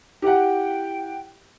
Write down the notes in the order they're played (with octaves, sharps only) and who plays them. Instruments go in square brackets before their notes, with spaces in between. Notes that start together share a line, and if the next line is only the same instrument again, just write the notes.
[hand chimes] E4 [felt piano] G4 F#5 [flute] G5